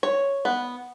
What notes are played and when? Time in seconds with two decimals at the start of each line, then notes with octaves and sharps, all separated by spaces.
0.03 C#5
0.45 B3